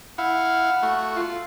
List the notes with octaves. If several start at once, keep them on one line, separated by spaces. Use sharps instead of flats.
E4 F5 F#5
A3 F#4
F4